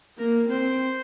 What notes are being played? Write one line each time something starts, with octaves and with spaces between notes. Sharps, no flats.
A#3 A#4
C4 C5